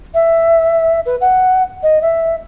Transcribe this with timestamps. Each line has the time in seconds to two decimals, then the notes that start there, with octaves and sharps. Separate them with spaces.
0.14 E5
1.06 B4
1.21 F#5
1.83 D#5
2.02 E5